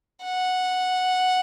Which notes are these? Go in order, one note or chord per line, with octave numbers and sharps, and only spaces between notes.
F#5